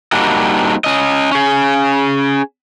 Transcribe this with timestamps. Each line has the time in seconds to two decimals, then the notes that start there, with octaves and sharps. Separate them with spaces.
0.12 G3 A#3 C4 D4 D#4 F#4
0.84 C#4 D#5
1.32 C#4 G#4